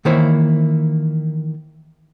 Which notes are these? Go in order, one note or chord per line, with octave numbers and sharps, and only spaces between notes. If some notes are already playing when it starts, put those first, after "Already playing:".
D#3 E3 A#3 E4 C5 C#5